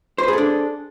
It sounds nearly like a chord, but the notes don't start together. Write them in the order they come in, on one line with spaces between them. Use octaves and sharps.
C5 B4 G#4 A4 D4